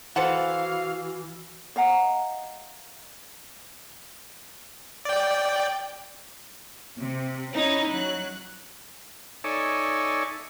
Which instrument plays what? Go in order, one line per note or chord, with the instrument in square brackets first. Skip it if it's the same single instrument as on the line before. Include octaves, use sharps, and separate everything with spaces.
[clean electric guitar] E3 [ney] F#4 [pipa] A4 C5 F#5 [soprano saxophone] F5
[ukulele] D#5 F5 F#5 A#5
[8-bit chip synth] D5 G5
[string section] C3
C#4 D#4 E4
F#3 F#6
[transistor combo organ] D#4 A4 C#5 D5 E5 G#5